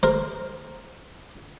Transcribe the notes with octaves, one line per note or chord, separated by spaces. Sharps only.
A#4 C5